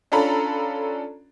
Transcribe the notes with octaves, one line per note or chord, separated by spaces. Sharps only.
C#4 D4 F4 A4 A#5 B5